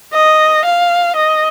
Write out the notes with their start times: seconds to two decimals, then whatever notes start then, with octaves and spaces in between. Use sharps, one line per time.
0.13 D#5
0.64 F5
1.15 D#5